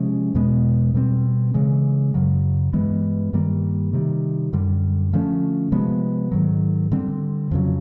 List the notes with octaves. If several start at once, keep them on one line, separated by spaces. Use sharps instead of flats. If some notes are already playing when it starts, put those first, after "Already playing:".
Already playing: C3 F3 G#3 C#4
E2 B2 G#3 B3
B2 G3 C4
C#3 E3 G#3
F#2 C#3 F#3
G2 E3 G#3 B3
G2 D#3 G3 A#3
C3 D#3 G3
F#2 D3 G3
D3 F3 A3 C#4
C3 F3 G#3 B3
G#2 D#3 F#3
D3 G3 C4
F2 C#3 F#3